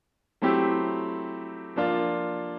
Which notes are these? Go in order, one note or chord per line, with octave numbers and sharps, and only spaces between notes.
F#3 A3 C4 E4 G4
F3 A#3 D4 F4